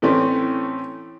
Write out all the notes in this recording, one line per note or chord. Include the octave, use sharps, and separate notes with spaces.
A2 E3 A3 C4 C#4